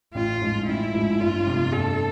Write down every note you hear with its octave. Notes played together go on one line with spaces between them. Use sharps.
A1 F4
G#2 F3 G#3
A1 E4
G#2 F3 G#3
G1 F4
F2 C3
G1 A4